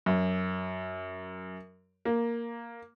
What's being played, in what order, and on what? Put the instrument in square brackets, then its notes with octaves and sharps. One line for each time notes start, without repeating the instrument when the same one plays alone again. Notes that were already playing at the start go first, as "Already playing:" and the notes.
[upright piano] F#2
A#3